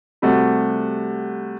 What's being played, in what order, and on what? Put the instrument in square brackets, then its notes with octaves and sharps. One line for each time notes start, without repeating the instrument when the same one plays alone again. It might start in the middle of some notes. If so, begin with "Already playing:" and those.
[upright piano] C3 G3 A3 F#4